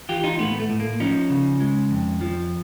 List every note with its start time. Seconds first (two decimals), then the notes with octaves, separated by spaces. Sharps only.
0.09 E3 F4 G4
0.24 D#4 F4
0.39 A2 A3 B3
0.60 A3
0.70 A2
0.80 A#3
1.00 F3 C#4 D#4
1.30 C#3
1.61 G#3
1.91 F2
2.21 F3